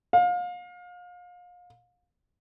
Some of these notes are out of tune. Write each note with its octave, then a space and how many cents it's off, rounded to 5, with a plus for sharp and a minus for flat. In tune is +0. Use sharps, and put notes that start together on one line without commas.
F5 +35